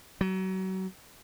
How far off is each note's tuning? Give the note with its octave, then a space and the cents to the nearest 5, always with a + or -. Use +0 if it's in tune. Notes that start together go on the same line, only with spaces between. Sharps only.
F#3 +30